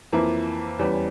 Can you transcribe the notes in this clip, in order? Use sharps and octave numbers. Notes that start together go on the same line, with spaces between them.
F2 E3 A#3 E4
E2 E3 G3 C#4